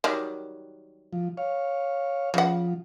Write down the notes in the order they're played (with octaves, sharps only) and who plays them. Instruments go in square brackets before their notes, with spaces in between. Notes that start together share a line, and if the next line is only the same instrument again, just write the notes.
[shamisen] D#3 F#3 G3
[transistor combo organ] F3
C#5 F5
[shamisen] C#3 F#5 [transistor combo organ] F3